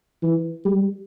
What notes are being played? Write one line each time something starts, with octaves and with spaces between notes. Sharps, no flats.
E3
G3